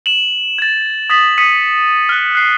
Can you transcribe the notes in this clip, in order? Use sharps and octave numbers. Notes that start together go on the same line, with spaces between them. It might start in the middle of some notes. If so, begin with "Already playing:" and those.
E7 F#7
G#6 A6
D#6 A6 B6 F#7
D#6 B6 C#7 D#7
F6 F#6
F#6 C7